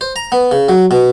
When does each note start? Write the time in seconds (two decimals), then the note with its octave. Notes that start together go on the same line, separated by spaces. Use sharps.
0.01 C5
0.16 A#5
0.32 B3
0.51 C#3
0.69 F#3
0.91 B2